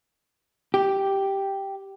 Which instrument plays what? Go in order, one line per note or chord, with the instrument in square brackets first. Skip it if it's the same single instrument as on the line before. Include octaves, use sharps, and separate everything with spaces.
[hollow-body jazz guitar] G4